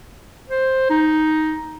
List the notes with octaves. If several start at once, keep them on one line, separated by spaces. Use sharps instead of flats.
C5
D#4